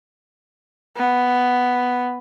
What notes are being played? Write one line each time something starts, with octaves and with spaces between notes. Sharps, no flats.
B3